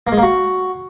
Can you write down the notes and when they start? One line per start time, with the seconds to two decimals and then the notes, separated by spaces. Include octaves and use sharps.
0.07 A#3
0.12 G#3
0.17 A#3
0.23 F#4